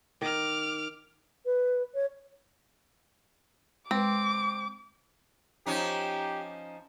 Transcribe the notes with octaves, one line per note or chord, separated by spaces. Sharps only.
D#3 D6 F6
B4
C#5
G#3 C4 B4 D6
F3 C#4 D#4 G4